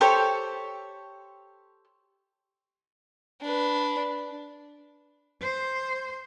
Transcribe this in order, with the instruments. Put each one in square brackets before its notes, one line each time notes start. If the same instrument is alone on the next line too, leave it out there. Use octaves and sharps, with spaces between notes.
[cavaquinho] G4 A4 C5 C#5
[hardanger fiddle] D4 B4
[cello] C5